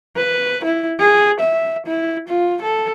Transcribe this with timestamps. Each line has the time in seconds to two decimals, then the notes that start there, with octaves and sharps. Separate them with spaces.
0.17 B4
0.64 E4
1.00 G#4
1.40 E5
1.86 E4
2.28 F4
2.62 A4